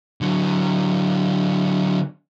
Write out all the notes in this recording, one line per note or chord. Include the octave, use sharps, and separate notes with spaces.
D3 F#3